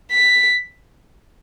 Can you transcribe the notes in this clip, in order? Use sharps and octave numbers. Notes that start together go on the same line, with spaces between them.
B6